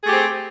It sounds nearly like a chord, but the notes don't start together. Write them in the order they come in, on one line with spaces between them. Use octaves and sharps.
G#4 A3 G4 C4